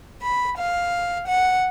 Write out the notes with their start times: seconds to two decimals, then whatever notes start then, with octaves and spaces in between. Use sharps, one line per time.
0.22 B5
0.58 F5
1.27 F#5